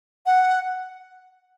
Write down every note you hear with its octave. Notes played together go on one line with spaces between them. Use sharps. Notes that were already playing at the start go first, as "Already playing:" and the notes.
F#5